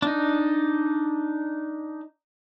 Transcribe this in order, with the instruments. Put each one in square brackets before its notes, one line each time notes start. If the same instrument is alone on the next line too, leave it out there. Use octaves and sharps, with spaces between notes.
[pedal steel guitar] D4 D#4